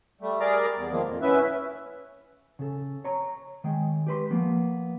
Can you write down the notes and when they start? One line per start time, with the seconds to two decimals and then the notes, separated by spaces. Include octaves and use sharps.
0.21 G3 A3
0.40 G3 G#4 A#4 D5 A#5 D6
0.76 E2
0.91 D#3 F3 G#3 A#3
1.06 F2 A#2
1.21 B3 C#4 E4 B4 E5
2.59 C#3 A4
3.05 C#5 A#5
3.64 D#3 G#3 G5
4.07 G4 B4 C6
4.30 F3 A#3 B3